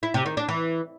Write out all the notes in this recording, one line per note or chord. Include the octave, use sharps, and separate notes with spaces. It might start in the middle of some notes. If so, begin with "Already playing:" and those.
E4
C3
D#3
D4
E3